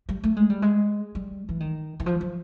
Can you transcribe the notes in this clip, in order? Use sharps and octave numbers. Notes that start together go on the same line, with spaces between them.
G3
A3
G#3
G3
G#3
G3
E3
D#3
E3
F3
F3